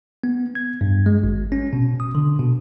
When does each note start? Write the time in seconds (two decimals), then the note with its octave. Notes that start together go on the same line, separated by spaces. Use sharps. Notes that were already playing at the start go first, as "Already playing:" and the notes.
0.24 B3
0.55 G#6
0.81 G2
1.06 G#3
1.23 G#1
1.52 C#4
1.73 B2
2.00 D#6
2.15 D3
2.39 B2